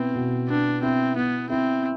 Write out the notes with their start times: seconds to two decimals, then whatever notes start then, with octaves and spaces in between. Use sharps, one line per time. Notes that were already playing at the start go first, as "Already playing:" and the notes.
Already playing: B2 B3 C4 E4
0.15 B2
0.49 B3 D4
0.82 C4 E4
1.16 B3 E4
1.50 C4 E4